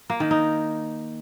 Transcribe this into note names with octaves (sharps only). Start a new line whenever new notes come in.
A#3
D#3
D#4